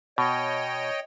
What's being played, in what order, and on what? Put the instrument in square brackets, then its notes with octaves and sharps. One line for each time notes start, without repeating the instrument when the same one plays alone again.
[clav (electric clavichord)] B2 [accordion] C#5 D#5 G5